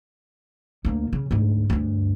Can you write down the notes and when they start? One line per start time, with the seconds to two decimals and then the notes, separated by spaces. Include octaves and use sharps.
0.85 D2 A#3
1.13 C#3
1.31 D2 G#2
1.70 D2 G2